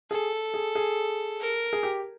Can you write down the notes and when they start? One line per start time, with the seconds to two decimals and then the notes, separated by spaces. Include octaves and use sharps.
0.10 G#4 A4
0.54 G#4
0.75 G#4
1.40 A#4
1.73 G#4
1.83 G4